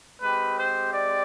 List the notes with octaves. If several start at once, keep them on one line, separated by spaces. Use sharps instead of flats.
G#3 C4 G4 B4
C5
D5